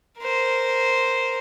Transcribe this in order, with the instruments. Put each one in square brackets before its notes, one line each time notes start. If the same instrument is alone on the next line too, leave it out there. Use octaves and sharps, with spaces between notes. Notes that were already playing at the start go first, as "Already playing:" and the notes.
[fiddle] A#4 C5